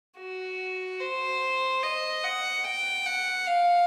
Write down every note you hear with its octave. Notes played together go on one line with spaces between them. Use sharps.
F#4
C5
D#5
F#5
G5
F#5
F5